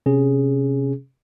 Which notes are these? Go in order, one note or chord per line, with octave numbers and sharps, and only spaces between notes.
C3 C#4 G#4